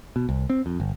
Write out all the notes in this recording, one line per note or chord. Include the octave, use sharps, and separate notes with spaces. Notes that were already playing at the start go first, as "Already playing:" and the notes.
B2
C2
C4
F2
G1